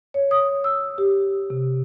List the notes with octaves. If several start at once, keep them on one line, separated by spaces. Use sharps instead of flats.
C#5
D#6
E6
G4
C3